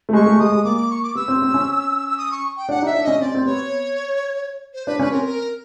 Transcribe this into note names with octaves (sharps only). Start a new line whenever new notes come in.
A3
G#3 C#6
A3
G#3 D#6
G#3
A#3 D6
D6
C#6
D6
B3 E6
C4
C4
C#4
E6
D#6
C#6
G5
D4 F#5
D#4 E5
D4
C#4 D#5
C4 D5
C4
B3 C#5
C5
D4 B4
C#4 B4
C4 A#4
A#4